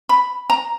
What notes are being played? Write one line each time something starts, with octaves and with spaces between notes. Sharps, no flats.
B5
A#5